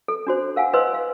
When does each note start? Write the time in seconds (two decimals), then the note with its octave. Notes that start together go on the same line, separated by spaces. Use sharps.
0.08 A4
0.27 D4 F#4 C5
0.56 A#4 F5 F#5 G#5
0.73 E4 B4 C5 D#5 C6 E6
0.94 F5